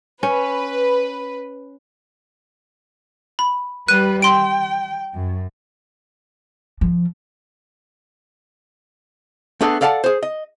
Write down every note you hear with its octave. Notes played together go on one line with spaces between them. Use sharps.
C#4 B4
B5
G3 B4 F#6 D#7
G5 C6 D7
F#2
F3
A3 B3 D4 G#4 A4
A4 D5 F5 F#5 A5
G#4 C5
D#5